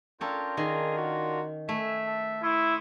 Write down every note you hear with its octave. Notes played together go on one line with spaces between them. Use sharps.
C#4 D4 F4 A4 A#4 G5
D#3 G#4
F#4
A3 E5 G#5
A4
E4 C6 C#6 D#6